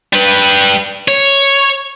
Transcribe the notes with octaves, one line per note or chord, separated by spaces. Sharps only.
G3 B4
C#5